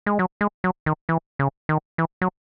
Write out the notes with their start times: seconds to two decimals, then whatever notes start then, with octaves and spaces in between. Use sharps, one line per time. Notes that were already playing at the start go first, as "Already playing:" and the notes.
0.06 G#3
0.19 F#3
0.41 G#3
0.64 F#3
0.86 D#3
1.09 E3
1.39 C#3
1.69 D#3
1.98 E3
2.22 F#3